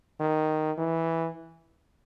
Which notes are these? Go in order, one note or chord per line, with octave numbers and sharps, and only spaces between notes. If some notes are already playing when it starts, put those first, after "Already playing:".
D#3
E3